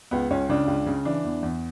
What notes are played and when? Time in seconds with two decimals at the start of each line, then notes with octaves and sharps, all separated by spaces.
0.11 C#2 B3
0.30 C#2 C#4
0.49 C#3 D4
0.67 C#2
0.86 C#3
1.05 E3 D4
1.24 E2
1.43 E2